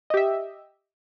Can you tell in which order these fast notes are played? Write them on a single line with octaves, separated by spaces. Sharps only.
D#5 G4 E5